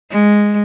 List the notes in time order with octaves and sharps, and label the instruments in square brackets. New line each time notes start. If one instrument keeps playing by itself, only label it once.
[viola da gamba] G#3